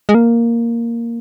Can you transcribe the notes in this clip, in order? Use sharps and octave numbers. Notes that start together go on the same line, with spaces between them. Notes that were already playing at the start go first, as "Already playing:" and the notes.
G#3
A#3